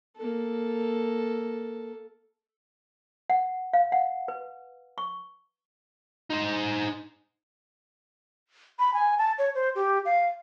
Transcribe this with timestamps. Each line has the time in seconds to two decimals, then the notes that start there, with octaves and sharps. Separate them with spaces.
0.17 A#3 A4
3.30 F#5
3.73 F5
3.92 F#5
4.28 B4
4.98 C#6
6.30 D#4 C5
8.79 B5
8.94 G#5
9.18 A5
9.38 C#5
9.55 C5
9.75 G4
10.05 F5